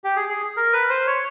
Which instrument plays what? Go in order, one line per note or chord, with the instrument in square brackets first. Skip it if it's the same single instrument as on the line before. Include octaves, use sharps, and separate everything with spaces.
[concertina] G4
G#4
G#4
A#4
B4
C5
C#5